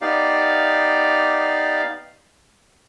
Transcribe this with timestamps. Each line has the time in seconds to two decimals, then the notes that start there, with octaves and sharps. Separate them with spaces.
0.02 B3 D#4 G4 D5 F5